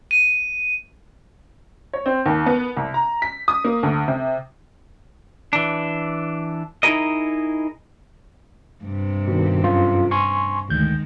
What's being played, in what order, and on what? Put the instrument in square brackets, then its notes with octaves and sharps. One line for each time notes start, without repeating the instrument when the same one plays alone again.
[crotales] D#7
[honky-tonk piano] C#5
C4
D#2
B3
C2
A#5
B6
D#6
A#3
D2
C3
[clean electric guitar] E3 D4
D#4 E4 F#4 G#4 A#4 D#5
[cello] G2 C3
[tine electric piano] B2 D#3
F#2 F4
G#5 C6 C#6
[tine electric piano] A1 D2 G6 [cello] D#3 G#3